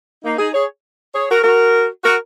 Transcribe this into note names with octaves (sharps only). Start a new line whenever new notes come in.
A#3 D#4
D#4 G#4
G#4 C#5
G#4 C#5
F#4 A#4
F#4 A#4
F#4 A#4